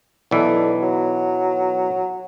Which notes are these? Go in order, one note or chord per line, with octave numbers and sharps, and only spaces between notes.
B1 D3 E3
F#3